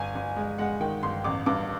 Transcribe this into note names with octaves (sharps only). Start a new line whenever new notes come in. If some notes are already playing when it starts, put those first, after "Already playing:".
Already playing: G1 G#5
G1
G#3
G#3 F#5
D#3 G5
G1 C6
A1 D6
G2 D6